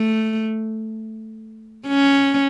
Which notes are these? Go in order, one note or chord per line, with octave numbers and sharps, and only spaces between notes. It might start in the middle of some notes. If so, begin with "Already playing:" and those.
Already playing: A3
C#4